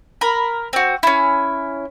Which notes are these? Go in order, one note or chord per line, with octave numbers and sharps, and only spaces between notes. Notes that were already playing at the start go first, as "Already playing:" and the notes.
A#4 B5
C4 F#4
C#4 E4